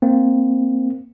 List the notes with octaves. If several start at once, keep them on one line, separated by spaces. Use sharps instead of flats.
A#3 C4